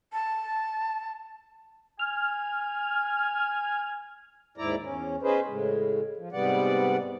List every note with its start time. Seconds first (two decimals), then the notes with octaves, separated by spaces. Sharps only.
0.13 A5
1.99 G#5 F6
4.58 D#2 G#2 E4 D5 A#5
4.83 E2 C#4
5.22 C#4 D#4 G#4 B4 C5
5.47 A2 C#3 G#3
6.17 F3
6.32 G#2 C3 G3 B3 D5 F#5